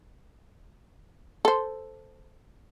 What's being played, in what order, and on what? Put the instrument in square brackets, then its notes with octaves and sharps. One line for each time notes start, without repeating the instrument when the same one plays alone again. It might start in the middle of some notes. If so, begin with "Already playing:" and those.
[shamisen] A4 C5